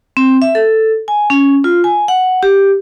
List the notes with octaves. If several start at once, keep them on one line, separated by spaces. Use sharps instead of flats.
C4
E5
A4
G#5
C#4
F4
G#5
F#5
G4